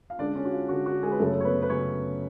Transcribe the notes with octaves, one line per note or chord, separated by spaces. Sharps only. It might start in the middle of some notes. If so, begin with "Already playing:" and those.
F5
D3 G#3 C#4 D4 D5
C#4 C#5
F#4
F4
D3 G#3 C#4 F#4
F#4
G#3 G#4
B4
F#2 C#3 F#3 A3 A4
C#5
B3 B4
B4
F#2 C#3 F#3 C#4 C#5